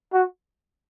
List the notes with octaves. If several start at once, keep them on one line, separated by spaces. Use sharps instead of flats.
F#4